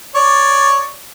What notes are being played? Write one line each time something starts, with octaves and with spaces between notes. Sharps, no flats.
C#5 D5